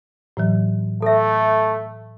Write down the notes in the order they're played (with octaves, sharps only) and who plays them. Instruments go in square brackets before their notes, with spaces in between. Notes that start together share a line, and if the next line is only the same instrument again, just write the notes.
[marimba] A2 E3 F#3
[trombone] A3 [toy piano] A4 E5